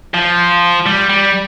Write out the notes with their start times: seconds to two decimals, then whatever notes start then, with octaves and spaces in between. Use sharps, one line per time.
0.14 F3
0.86 G3
1.10 G3